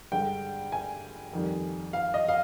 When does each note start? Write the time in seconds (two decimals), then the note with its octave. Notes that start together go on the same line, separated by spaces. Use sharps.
0.12 G2 D3 G#3 G5
0.72 G#5
1.33 F2 D#3 G3
1.93 F5
2.14 D#5
2.28 F5